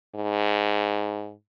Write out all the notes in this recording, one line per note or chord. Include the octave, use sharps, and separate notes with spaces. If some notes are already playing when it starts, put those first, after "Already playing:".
G#2